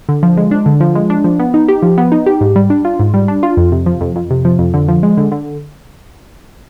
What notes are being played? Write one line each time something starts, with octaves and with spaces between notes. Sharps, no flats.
D3
F3
G#3
D4
D3
F3
G#3
D4
F3
B3
D#4
G4
F3
B3
D#4
G4
G#2
G3
D4
F4
G#2
G3
D4
F4
F2
C3
F3
F2
F2
C3
F3
F2
D3
F3
G#3
D3
D3